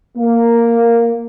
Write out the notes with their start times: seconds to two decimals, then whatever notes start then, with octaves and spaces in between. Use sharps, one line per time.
0.17 A#3